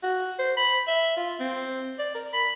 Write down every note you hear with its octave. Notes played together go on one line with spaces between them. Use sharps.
F#4
C5
B5
E5
F4
C4
D5
A#4
B5